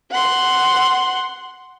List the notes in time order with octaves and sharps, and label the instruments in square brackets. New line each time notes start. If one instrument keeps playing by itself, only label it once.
[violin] F#5 C6